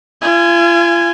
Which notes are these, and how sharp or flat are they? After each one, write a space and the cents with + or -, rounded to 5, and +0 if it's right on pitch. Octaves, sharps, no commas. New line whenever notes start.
F4 -40 G#5 +0